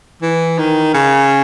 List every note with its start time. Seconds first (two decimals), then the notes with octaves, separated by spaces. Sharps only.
0.22 E3
0.59 D#3
0.94 C#3